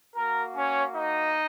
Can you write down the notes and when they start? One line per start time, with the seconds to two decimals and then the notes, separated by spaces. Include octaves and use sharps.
0.15 A#3 F#4 A#4
0.55 C#4 C#5
0.94 D#4 D#5